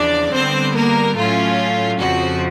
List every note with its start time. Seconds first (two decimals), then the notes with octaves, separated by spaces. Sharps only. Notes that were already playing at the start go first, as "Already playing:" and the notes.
Already playing: E2 C#3 F3 D4 D5
0.33 D3 G3 B3 C4 C5
0.75 A#3 A#4
1.17 A2 F#3 A3 C#4 F4
2.00 F2 C#3 F3 F#4